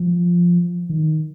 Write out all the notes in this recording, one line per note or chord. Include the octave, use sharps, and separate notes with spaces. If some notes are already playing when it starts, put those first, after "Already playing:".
Already playing: F3
D#3